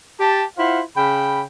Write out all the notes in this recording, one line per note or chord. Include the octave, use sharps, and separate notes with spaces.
G4 A5
E4 F4 C5 F5 F#5
C#3 G5 B5